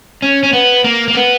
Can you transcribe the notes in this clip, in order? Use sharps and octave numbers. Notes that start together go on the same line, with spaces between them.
C#4
C#4
B3
A#3
A#3
B3